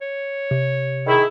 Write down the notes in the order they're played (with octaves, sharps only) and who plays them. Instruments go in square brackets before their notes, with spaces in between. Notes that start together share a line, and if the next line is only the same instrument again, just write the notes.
[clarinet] C#5
[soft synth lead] C3
[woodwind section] D#3 E4 [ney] G#4